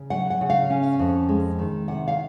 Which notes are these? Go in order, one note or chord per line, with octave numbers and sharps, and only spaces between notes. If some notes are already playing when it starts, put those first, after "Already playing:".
Already playing: C#3
F#3 F#5
F#5
C#3
F5
C#4
F2
G#3
D#3
C3 F#5
F5